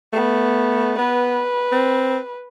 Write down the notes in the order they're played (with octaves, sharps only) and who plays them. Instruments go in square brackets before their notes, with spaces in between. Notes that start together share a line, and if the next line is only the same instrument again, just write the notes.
[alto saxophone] A3 [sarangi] B3
[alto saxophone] B3 [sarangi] B4
[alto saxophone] C4